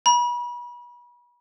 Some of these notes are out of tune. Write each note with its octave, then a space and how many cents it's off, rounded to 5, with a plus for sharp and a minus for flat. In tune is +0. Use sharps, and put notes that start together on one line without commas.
B5 -35